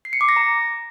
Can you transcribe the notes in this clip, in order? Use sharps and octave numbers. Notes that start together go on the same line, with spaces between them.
C7
C#7
D6
A#6
A#5